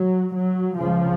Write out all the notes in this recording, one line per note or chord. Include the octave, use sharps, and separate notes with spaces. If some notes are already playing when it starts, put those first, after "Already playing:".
Already playing: F#3
F#3
C#2 C#3 F3